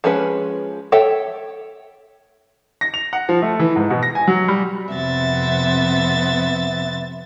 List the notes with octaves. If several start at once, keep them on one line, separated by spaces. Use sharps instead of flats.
F3 G#3 C#4 B4
A4 C#5 E5 G5
A#6
F7
F#5
F3
A3
E3
G#2
B2
A#6
G#5
F#3
G3
F2 C3 B3 E5 A6